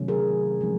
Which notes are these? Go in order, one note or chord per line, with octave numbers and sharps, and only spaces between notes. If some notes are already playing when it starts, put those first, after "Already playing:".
Already playing: C3 D#3 F#3 A3 C#4
G#4 A#4
F3 G#3 C4 D#4